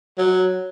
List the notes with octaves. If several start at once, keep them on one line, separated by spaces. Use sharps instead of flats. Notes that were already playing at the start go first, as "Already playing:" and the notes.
F#3